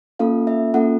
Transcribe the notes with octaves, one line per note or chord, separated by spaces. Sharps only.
A#3 C#4 F4 A4 F5
E5
A#3 C#4 F4 A4 F#5